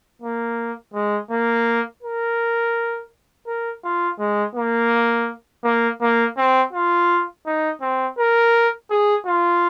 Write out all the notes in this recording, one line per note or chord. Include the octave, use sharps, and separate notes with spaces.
A#3
G#3
A#3
A#4
A#4
F4
G#3
A#3
A#3
A#3
C4
F4
D#4
C4
A#4
G#4
F4